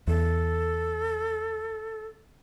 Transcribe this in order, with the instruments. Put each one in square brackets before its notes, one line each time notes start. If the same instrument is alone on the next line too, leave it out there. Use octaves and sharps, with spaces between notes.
[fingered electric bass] E2 [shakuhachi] A4